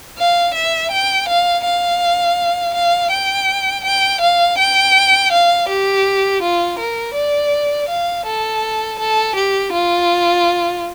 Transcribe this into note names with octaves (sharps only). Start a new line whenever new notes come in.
F5
E5
G5
F5
F5
F5
G5
G5
F5
G5
F5
G4
F4
A#4
D5
F5
A4
A4
G4
F4